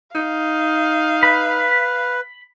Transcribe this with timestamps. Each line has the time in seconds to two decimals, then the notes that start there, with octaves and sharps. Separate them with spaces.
0.15 D#4 F5
1.23 B4 B5